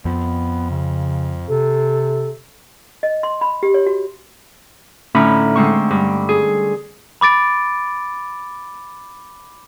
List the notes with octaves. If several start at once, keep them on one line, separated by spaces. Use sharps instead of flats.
F2 F3 B3
C#3
C3 A4
D#5
C6
B5
G4
C#5
F#4
A2 D3 C#4 D#4 B5
D3 G#3 C4 C#6
G2
G#4
B5 D6 A6 D7